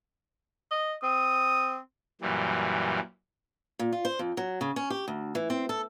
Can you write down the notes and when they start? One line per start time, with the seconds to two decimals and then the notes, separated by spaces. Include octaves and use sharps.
0.71 D#5
1.03 C4 D#6
2.21 F#2 A#2 E3 G3
3.79 A#2
3.92 F4
4.05 C5
4.19 F2
4.37 F#3
4.61 C#3
4.76 C#4
4.90 G4
5.08 D2
5.35 E3
5.50 C4
5.69 A4